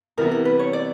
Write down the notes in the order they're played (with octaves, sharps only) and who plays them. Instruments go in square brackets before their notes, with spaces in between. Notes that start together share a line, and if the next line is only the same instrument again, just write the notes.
[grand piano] C3 E3 G3 B3 E4 [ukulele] A#4
[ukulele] A#4
B4
C#5
D5